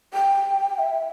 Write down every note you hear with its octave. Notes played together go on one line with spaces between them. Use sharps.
G5
E5